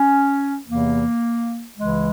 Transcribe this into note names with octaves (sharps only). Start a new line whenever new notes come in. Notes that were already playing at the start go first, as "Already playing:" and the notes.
Already playing: C#4
E2 C3 E3 A#3
C#2 C#3 E3 G#3